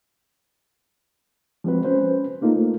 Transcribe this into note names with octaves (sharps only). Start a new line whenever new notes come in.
F3 G#3 C4 F#4 B4
C#4 B4 C5
A3 A#3 D#4 F4 A4